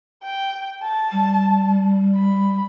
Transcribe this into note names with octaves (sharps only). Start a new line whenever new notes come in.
G5
A5
G3
B5